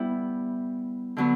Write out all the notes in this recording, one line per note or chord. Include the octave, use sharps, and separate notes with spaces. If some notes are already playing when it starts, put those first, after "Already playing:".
Already playing: G3 B3 E4
D3 F#3 B3